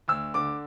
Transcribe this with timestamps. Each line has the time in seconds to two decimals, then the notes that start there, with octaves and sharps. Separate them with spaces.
0.08 D2 E6
0.34 D3 D6